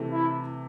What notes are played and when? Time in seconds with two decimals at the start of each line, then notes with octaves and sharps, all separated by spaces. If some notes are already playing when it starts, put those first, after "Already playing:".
Already playing: C3 E3 A3
0.12 E4